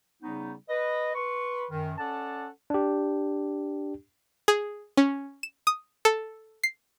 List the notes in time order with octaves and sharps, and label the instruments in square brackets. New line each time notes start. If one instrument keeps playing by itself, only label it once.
[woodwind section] C#3 G3 B3 C#4 D#4
B4 D#5
B4 C6 C#6
F#2 D#3
C#4 A4 D5 F#5 A5
[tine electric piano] D4 G4
[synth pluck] G#4
C#4
E7
D#6
A4
C7